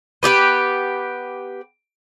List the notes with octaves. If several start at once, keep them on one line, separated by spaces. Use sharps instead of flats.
B3 G4 G#4 B4